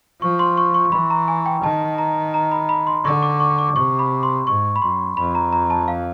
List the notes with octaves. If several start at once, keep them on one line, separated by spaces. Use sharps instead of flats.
F3 C#6
C6
C#6
C#6
E3 B5
A#5
G#5
G5
D#3 A5
A#5
A#5
B5
B5
C6
D3 C#6
D6
C#6
D6
C3 C#6
B5
C6
G#2 C#6
B5
F#2 C6
F2 B5
A#5
A#5
A5
F5